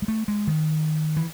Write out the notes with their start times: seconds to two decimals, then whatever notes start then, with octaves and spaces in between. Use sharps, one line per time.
0.02 G#3
0.08 A3
0.28 G#3
0.47 D#3
1.17 E3